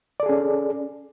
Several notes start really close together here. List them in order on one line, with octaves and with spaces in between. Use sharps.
D5 A4 G#4 C#4